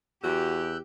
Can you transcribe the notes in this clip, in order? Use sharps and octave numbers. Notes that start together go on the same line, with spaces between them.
E2 F#4 G4 E6 F#6 G6